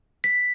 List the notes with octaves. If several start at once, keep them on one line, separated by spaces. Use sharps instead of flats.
B6